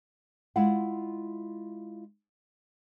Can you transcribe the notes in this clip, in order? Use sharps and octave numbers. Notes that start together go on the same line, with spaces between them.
G#3 E4 F4 F5 F#5